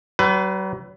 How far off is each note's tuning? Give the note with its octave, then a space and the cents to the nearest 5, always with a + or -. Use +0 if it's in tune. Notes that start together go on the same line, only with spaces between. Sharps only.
F#3 +45 B4 +20